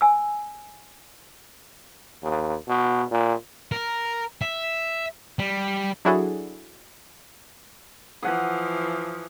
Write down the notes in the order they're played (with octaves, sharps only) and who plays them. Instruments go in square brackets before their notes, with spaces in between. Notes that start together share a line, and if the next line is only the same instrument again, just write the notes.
[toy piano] G#5 E6
[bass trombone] D#2
B2
A#2
[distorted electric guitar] A#4
E5
G3
[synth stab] F#3 D4 E4 F#4 G#4 A4
[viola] E3 F3 [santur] F#5 D#6